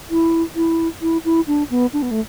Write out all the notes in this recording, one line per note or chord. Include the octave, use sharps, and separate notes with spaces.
E4
E4
E4
E4
D4
B3
D4
B3
A3